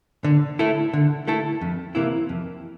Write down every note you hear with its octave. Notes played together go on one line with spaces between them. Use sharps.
D3
A3 E4 A4
D3
A3 E4 A4
F2
C3 E3 A#3 E4
F2